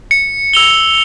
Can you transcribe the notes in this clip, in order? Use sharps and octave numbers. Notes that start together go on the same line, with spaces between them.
C#7
E6 F7 G7